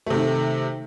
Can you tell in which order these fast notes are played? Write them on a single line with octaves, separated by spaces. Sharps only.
A3 C3 D#3